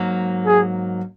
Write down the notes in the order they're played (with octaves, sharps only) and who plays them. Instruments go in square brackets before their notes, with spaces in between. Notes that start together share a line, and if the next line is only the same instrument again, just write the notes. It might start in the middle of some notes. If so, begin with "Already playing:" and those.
Already playing: [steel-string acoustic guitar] G#2 F#3 A#3
[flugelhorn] G#4